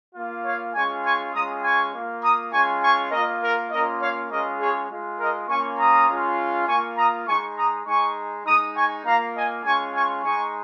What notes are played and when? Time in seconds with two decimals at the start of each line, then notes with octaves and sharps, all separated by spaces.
0.14 A#3 F4
0.45 C#5 F5
0.75 G#3 C#4 F4 G#5 C#6
1.03 G#5 C#6
1.33 G#3 C#4 F4 A#5 D#6
1.63 G#5 C#6
1.94 A#3 F4
2.22 A#5 D#6
2.52 G#3 C#4 F4 G#5 C#6
2.82 G#5 C#6
3.11 A#3 F4 A#4 D#5
3.42 A#4
3.71 A#3 C#4 F4 A#4 D#5
4.01 C#5 F5
4.30 G#3 C#4 F4 A#4 D#5
4.60 G#4 C#5
4.89 G#3 F4
5.20 A#4 D#5
5.49 A#3 C#4 F4 G#5 C#6
5.79 A#5 D#6
6.09 G#3 C#4 F4
6.67 A#3 F4 G#5 C#6
6.97 A#5 D#6
7.27 G#3 D#4 G#5 C#6
7.57 A#5 D#6
7.86 G#3 D#4 G#5 C#6
8.46 G#3 D#4 A#5 D#6
8.75 G#5 C#6
9.05 A#3 F4 F5 A#5
9.35 D#5 G#5
9.64 G#3 C#4 F4 G#5 C#6
9.94 G#5 C#6
10.23 G#3 D#4 G#5 C#6